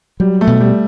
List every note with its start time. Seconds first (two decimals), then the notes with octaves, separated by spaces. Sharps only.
0.20 F#3 G3
0.41 A3
0.47 B2
0.60 G3